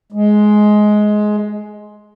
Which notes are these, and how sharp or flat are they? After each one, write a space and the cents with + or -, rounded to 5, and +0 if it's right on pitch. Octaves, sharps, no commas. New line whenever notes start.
G#3 +15